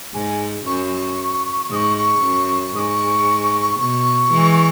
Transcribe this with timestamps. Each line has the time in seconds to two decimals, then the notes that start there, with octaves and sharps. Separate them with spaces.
0.14 G#2 G#5
0.66 F#2 C#6
1.70 G#2 D#6
1.75 C#6
1.97 C#6
2.23 F#2
2.75 G#2 C#6 D#6
3.80 B2 C#6
4.32 E3 G#3